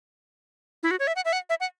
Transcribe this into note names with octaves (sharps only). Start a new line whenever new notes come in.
E4
F#4
C#5
E5
F#5
E5
F#5
E5
F#5